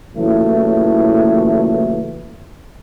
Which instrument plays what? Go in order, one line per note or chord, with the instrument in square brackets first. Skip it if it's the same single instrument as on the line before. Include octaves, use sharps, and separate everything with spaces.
[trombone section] A#2 C#3 E3 F#3 A3 E4